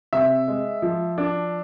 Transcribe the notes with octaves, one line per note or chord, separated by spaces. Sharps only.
C3 E5
G#3
F3
D4